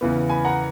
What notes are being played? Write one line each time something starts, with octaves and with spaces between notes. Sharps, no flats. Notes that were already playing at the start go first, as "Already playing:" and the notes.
E2 C#3 E3 B3
G#5 B5
F#5 A#5